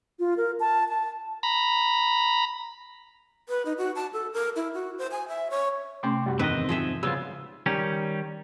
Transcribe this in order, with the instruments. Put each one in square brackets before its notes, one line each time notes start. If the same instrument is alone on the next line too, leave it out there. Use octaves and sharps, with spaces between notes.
[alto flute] F4
A#4
A5
A5
[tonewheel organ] A#5 B5
[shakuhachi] B4
D#4
F#4
A5
A4
A#4
E4
F#4
C5
G#5
E5
C#5
[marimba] C3 A3 C#4 [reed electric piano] G5 C6 D6
[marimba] F#2 C3 [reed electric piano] G3 F#4 G4
[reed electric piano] E2 E3 [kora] G#2 D#3 B4 [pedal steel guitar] C4 D#5
[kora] F3 G#4 E5
[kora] C#3 [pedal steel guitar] G3 B3 F4 [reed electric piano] E6
[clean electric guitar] D#3 G3 C#4